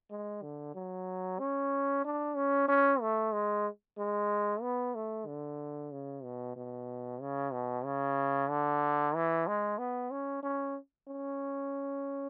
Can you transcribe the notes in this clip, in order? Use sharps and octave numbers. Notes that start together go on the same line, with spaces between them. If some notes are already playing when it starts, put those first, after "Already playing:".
G#3
D3
F#3
C#4
D4
C#4
C#4
A3
G#3
G#3
B3
A3
D3
C#3
B2
B2
C#3
B2
C#3
D3
E3
G#3
B3
C#4
C#4
C#4